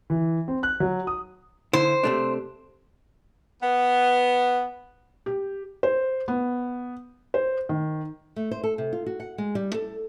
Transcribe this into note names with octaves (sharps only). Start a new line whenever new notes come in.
E3
C4
F#6
F#3
D#6
D3 E4 C5
C3 A3 D4
B3
G4
C5
B3
C5
D#3
A3
C5
A4
C3
F4
F#4
F#5
G#3
G3
A4